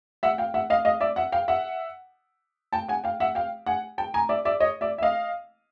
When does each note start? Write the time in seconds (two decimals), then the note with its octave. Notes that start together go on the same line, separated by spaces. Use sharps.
0.23 E5 F#5
0.38 F5 G5
0.54 E5 F#5
0.70 D#5 F5
0.85 D#5 F5
1.01 D5 E5
1.16 E5 F#5
1.32 F5 G5
1.48 E5 F#5
2.73 G5 A5
2.89 F#5 G#5
3.04 F5 G5
3.20 E5 F#5
3.35 F5 G5
3.66 F#5 G#5
3.98 G5 A5
4.14 G#5 A#5
4.29 D5 E5
4.45 D5 E5
4.60 C#5 D#5
4.81 D5 E5
4.98 E5
5.02 D#5 F5